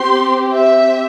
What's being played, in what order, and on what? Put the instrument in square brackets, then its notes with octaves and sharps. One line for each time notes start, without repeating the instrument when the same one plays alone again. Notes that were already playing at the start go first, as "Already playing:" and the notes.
Already playing: [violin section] C4 G4 C6
E5